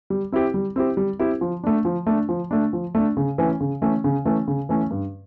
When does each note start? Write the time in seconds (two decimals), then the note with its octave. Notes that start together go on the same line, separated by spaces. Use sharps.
0.10 G3
0.32 C4 E4 G4
0.54 G3
0.76 C4 E4 G4
0.97 G3
1.20 C4 E4 G4
1.41 F3
1.64 A3 D4
1.85 F3
2.07 A3 D4
2.29 F3
2.51 A3 D4
2.73 F3
2.95 A3 D4
3.17 C#3
3.38 E3 A3 C#4
3.60 C#3
3.82 E3 A3 C#4
4.04 C#3
4.25 E3 A3 C#4
4.48 C#3
4.69 E3 A3 C#4
4.91 G2